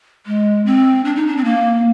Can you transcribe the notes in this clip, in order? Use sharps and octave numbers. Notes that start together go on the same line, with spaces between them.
G#3
C4
D4
D#4
D4
C4
A#3